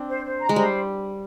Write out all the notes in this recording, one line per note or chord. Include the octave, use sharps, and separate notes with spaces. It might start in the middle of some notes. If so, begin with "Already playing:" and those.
Already playing: C4 D4
C5
C5
A#5
G#3
G3 C5